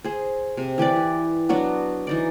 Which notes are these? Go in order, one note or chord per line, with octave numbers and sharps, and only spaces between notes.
G#4 C5
C3
E3 G4 B4 D5
E4
F#3 B3 D4 F#4
E3 D#4 D5